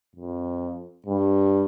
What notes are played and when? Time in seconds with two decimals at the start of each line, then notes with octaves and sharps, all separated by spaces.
0.16 F2
1.06 G2